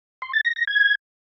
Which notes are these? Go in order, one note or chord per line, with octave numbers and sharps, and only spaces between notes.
C6
A6
A#6
A#6
G#6